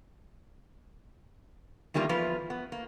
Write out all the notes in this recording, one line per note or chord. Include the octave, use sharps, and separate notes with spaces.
E2 D#3 G3 A#3 F4
E2 F3 F4 B4
B3
A#3